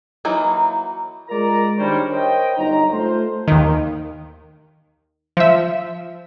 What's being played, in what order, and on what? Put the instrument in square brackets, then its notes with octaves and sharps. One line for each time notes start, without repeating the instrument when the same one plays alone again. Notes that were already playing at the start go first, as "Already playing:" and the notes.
[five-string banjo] E3 F#3 A#3 D#4
[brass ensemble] G#3 F4 A#4 D5 A#5
D#3 G3 D4 A#4 C5 C#5
A#4 C5 C#5 D#5 G5
G1 F#3 D#4 A#5
A3 F4 A4 C5
[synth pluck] D#2 D#3
F3 E5